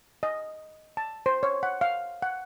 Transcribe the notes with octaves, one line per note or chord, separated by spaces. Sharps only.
D#5
A5
C5
C#5
F#5
F5
F#5